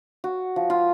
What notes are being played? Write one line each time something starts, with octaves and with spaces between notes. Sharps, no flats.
F#4
F3
F4